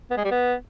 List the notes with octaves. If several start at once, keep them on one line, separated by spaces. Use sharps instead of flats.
B3
G#3
G3
B3